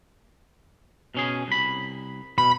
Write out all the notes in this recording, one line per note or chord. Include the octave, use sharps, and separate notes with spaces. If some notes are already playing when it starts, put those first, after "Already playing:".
B2 C#4 G#4
C2 B5
B2 B5